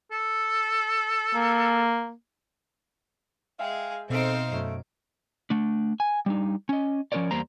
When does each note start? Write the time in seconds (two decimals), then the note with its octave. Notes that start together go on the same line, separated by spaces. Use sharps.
0.11 A4
1.35 A#3
3.59 G#3 G#4 E5 F5 G5
4.10 B2 C4 D#4 A4 C5 F5 D7
4.52 F#2 A3
5.50 A3 D4
6.00 G#5
6.26 G3 D4 D#4
6.69 C#4 D#5
7.12 F3 C#4 F4 A#4 C#5 D5
7.31 E2 G3 A#3 C5 A#5